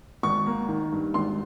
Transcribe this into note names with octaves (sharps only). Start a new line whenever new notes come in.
G#1 C#6
A#3
D#3
G2
G#1 C6